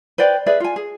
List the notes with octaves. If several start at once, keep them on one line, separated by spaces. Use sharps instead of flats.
B4 C5 D5 G5
G#4 B4 D5 E5
F4 G#5
G#4